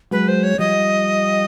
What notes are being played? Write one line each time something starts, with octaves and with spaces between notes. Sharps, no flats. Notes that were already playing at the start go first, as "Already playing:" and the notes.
F#3 G#3 B4
C5
C#5
F3 G3 D#5